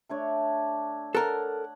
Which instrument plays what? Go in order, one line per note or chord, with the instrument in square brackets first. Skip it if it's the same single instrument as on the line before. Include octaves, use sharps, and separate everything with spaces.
[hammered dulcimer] A3 D4 C#5
[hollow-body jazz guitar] A4 A#4 [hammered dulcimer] F#5